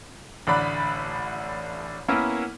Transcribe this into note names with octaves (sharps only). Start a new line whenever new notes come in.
A1 D3 D5 B5 F#6
A#3 B3 C#4 E4 A#4